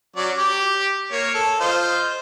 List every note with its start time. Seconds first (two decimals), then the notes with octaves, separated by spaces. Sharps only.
0.16 F#3 C#4 D5
0.37 G4 D6
1.12 A#3 C#5
1.34 A4
1.60 F4 C5 D#5